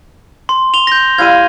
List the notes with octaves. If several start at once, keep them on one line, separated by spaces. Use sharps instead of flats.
C6
F7 G7
G6 A#6
G3 E4 F5 G#6 D#7